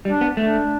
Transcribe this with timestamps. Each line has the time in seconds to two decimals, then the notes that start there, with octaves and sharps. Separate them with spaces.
0.05 G3 D4
0.21 B3
0.37 A3 D4